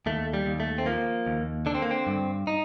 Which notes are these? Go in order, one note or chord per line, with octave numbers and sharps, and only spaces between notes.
D#2 A3
G3
D#2
A3
C4
F3 A#3
D#2
D3 D4
C4
A#3
C4
G2
D#4